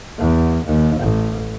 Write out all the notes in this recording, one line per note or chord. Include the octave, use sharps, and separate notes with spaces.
E2
D#2
A1